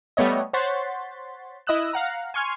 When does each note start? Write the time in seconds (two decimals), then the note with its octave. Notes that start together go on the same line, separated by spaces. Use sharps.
0.17 G3 A3 B3 C#5 D#5
0.53 C5 C#5 F#5 C6 A6 B6
1.67 E4 D#5 D#6 E6 F#6 E7
1.93 F5 F#5 A#5
2.34 G#5 C6 C#6 F6 G#6